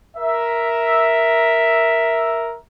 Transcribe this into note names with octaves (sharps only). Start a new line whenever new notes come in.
A#4 E5